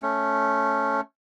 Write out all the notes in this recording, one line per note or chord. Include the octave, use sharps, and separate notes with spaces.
A3 C#4